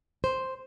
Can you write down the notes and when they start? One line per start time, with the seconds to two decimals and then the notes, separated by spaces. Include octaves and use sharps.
0.24 C5